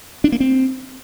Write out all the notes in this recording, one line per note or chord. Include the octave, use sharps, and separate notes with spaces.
D4
A#3
C4